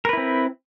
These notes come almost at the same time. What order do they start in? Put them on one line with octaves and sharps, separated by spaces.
A#4 B4 E4 C4